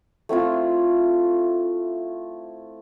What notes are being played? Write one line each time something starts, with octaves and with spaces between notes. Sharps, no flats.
A3 C4 E4 F4